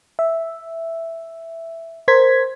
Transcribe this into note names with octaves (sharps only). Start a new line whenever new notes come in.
E5
A#4 C5 G#6 B6